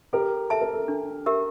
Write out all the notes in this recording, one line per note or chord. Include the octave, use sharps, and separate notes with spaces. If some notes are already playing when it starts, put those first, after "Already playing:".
G4 A4 A#4
A4 E5 A5
A#4
A4
D4 A4
G4 A#4 E5